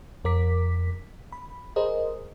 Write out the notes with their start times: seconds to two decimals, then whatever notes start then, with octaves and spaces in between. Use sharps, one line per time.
0.25 F2 A#4 D6 B6
1.32 B5
1.76 G#4 A#4 C5 D#5